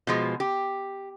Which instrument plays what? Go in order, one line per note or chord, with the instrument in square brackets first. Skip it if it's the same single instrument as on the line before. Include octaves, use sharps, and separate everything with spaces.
[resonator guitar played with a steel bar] B2 F3 G#3
G4